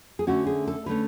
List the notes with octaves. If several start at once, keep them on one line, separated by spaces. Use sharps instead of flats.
G#4
D3 A3 C#4 F#4
G#4
A4
D3 A3 C#4 B4